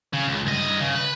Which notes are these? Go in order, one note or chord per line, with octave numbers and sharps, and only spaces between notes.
C#3
C#2
G2 D#5
C#3
B4